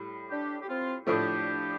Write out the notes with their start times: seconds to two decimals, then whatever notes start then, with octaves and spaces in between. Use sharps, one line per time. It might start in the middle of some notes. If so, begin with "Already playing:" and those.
Already playing: A2 G3
0.30 D4 G4
0.62 G4
0.68 C4 F4
1.06 A2 F3 A3 D4 G4